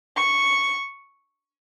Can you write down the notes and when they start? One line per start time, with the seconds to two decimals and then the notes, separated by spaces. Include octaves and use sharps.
0.17 C#6